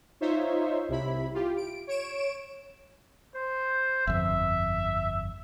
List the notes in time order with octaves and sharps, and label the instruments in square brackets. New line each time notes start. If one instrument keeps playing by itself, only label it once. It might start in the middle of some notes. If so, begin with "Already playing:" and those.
[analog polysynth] D#4 F4 C5 C#5 E5
C2 C3 E4 B5
F4 G4
D7
C#5 D7 E7
[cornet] C5
[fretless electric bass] G1 F2 [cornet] E5